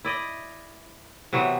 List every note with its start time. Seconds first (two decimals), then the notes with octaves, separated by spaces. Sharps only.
0.05 E4 D5 D#5
1.33 C3 E3 F#3 B3